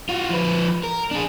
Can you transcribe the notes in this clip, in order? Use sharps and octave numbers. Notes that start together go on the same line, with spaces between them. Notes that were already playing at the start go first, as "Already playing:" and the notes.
F4 F#4
F3 B4
A#4
D4 G#4